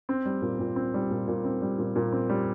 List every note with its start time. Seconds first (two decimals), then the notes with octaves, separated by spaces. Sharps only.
0.09 C4
0.25 G3
0.42 A#2
0.59 A#2
0.76 C4
0.94 G3
1.11 A#2
1.28 A#2
1.44 C4
1.62 G3
1.78 A#2
1.96 A#2
2.12 C4
2.29 G3